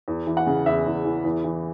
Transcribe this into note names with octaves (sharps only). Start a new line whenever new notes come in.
E2
E3
F#5
C#3
E2 E5
E2
E3
E2
E3